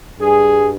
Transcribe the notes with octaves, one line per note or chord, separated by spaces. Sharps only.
G2 G3 G#4